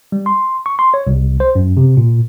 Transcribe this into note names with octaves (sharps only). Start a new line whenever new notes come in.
G3
C6
C#6
C6
C#5
C2
C5
F#2
C3
A#2